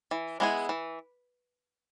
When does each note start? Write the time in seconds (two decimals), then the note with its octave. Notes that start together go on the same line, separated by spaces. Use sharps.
0.11 E3
0.40 G#3 B3 E4 G#4
0.69 E3